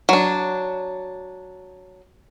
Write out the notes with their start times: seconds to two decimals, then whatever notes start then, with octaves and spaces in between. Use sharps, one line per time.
0.09 F#3 D4